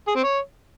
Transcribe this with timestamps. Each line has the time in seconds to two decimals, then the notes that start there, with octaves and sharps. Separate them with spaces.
0.08 G#4
0.16 C4
0.24 C#5